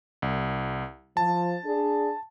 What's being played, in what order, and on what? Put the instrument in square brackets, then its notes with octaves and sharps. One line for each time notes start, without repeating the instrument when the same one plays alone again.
[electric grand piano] C2
[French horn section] F3 [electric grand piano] A5
[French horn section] D4 G#4